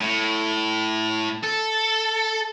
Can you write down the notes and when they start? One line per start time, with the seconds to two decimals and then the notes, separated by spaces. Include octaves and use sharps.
0.01 A2
1.43 A4